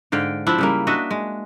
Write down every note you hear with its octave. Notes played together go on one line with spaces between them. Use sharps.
G#2 D3 F5 G5
F3 C4 D4 E4
C#3 G3 A#3
D4 F#4 D#5 E5
G#3